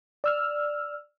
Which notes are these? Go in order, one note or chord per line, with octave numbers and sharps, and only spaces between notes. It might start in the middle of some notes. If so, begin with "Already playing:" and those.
D5 E6 F6